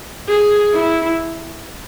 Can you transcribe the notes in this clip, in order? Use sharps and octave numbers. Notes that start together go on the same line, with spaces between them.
G#4
E4